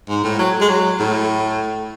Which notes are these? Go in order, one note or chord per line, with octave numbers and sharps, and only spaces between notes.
G#2
A2
F#3
G#3
F#3
A2